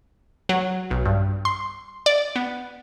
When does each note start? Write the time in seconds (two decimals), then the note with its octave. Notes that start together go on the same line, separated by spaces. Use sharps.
0.49 F#3
0.91 B1
1.05 G2
1.45 C6
2.06 D5
2.36 B3